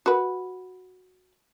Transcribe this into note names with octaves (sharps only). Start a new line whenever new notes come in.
F#4 B4